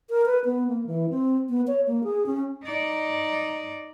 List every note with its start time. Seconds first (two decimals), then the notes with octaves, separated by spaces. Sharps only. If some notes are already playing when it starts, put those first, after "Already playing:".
0.10 A#4
0.26 B4
0.45 B3
0.68 A#3
0.87 E3
1.10 C4
1.49 B3
1.67 C#5
1.87 A#3
2.04 G#4
2.26 C#4
2.63 D#4 D5